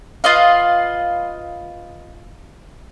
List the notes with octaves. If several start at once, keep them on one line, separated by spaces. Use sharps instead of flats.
F4 B4 D#5 F5